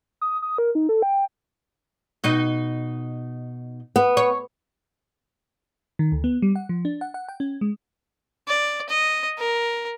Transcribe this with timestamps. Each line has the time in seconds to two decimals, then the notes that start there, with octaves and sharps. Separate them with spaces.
0.21 D#6
0.42 D#6
0.58 A#4
0.75 D#4
0.89 A4
1.02 G5
2.24 B2 D#4 D#5
3.96 B3
4.17 C#5
5.99 D#3
6.12 D2
6.24 B3
6.42 G3
6.56 F#5
6.69 F3
6.85 D4
7.01 F#5
7.14 F#5
7.29 G5
7.40 C#4
7.61 G#3
8.47 D5
8.89 D#5
9.38 A#4